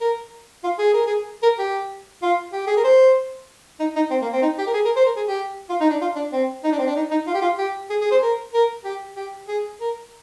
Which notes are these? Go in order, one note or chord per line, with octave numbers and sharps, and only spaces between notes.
A#4
F4
G#4
A#4
G#4
A#4
G4
F4
G4
G#4
A#4
C5
D#4
D#4
C4
A#3
C4
D#4
G4
A#4
G#4
A#4
C5
A#4
G#4
G4
F4
D#4
D4
F4
D4
C4
D#4
D4
C4
D4
D#4
D#4
F4
G4
F4
G4
G#4
G#4
C5
A#4
A#4
G4
G4
G#4
A#4